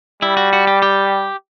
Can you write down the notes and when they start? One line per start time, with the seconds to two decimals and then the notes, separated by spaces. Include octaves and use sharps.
0.22 G3 E4
0.37 F#4
0.53 F#4
0.67 G4
0.82 G4